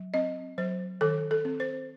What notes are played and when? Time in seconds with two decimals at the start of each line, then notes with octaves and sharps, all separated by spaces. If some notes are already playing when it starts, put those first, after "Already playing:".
Already playing: F#3
0.14 C4 D#5
0.58 F#3 C5
1.01 D#3 A4
1.31 A4
1.45 C4
1.60 C5